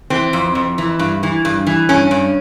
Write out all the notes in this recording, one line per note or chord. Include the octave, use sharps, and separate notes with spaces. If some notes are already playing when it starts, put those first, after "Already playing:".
E3 C4
F2
F2
E3
G2
E3
G2
E3
G2 C#4
G2